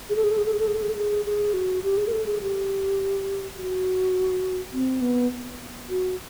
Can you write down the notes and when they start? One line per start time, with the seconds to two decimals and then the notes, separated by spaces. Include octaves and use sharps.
0.10 G#4
0.16 A4
0.24 G#4
0.31 A4
0.38 G#4
0.46 A4
0.53 G#4
0.60 A4
0.67 G#4
0.75 A4
0.82 G#4
0.89 A4
0.97 G#4
1.25 G#4
1.53 F#4
1.84 G4
1.97 G#4
2.07 A#4
2.12 A4
2.26 G#4
2.41 G4
3.57 F#4
4.73 C4
5.01 B3
5.89 F#4